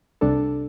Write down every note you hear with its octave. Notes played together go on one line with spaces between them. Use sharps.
C2 C3 G3 D4 A4